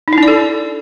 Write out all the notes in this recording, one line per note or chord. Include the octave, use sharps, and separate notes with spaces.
D#4
E4
D4
D5
A4